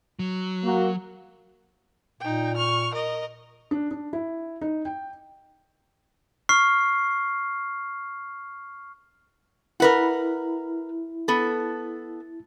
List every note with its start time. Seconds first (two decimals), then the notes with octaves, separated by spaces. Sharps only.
0.19 F#3
0.64 A#3 F#4
2.21 A#2 D#4 G5
2.57 C#6 F6
2.94 A#4 D#5
3.71 D4
3.91 D4
4.13 E4
4.61 D#4
4.85 G5
6.49 C#6 F6 C7
9.80 E4 A#4 B4 F#5
11.28 B3 A4